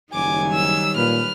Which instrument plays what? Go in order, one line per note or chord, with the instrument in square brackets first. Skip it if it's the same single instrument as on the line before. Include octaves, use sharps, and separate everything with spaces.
[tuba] F#1 [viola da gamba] D#3 F#3 G3 [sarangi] G#5 [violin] D6
[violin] E6
[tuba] A#2 [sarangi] B4 [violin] F6